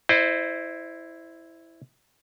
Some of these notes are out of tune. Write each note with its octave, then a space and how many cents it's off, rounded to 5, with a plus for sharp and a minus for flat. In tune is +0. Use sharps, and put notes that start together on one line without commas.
E4 +0 C5 +0 D#5 -45